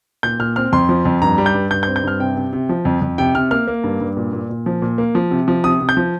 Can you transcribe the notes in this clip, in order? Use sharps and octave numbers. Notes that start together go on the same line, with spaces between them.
A#2 G6
A#2 F6
C4 F6
F2 C6
F3
F2
G2 A#5
G3
G6
G2
G2 G6
G6
C4
G6
G2 F6
C3 G5
C3
C3
F3
F2
F2
C3 G5
C3 F6
A#3 F6
A#3
G2
G2
A#2
A#2
A#2
F3
A#2
A#3
F3
C3
F3
C3 D#6
C3
G6
F3